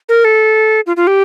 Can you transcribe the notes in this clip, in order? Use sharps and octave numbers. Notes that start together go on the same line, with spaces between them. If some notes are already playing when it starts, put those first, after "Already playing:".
A#4
A4
F4
F4
G4